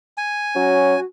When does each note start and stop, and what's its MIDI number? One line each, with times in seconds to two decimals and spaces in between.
0.17 1.00 80
0.56 0.96 54
0.56 0.95 61
0.56 1.03 66